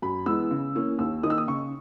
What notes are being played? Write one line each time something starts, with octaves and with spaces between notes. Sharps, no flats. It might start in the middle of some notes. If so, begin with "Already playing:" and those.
F#2 B5
E3 G#3 B3 E6
C#3
E3 A#3 C#4
D#2 E6
D#3 A#3 D#4 D#6
E6
D#6
C#3 C#6